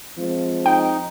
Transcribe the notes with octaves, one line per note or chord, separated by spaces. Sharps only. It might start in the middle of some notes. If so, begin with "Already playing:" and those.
F3 G#3 C4
D#4 G5